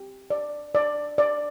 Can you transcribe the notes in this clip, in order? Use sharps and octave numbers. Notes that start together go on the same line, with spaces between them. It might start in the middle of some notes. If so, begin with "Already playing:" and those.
Already playing: G4
D5
D5
D5